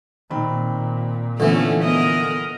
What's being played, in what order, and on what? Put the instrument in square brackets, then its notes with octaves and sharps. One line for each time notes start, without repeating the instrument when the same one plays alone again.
[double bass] A#2 [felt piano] D#3 C4 B5
[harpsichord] D3 E3 [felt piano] F3 [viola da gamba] A3 B3 C#4
[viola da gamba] B3 A#4 D#5